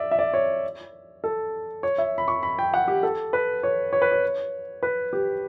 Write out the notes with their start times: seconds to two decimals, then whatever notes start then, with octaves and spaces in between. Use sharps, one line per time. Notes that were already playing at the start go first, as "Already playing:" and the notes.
Already playing: D5 E5
0.11 E5
0.19 D5
0.34 C#5
1.24 A4
1.83 C#5
1.98 E5
2.18 B5
2.28 C#6
2.43 B5
2.59 G5
2.74 F#5
2.88 G4
3.03 A4
3.33 B4
3.63 C#5
3.93 C#5
4.02 B4
4.12 C#5
4.83 B4
5.13 G4